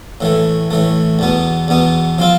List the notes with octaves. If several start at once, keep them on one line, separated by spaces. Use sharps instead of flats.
A2 E3 A3
A2 E3 A3
E2 B2 B3
E2 B2 B3
F3 C4 F4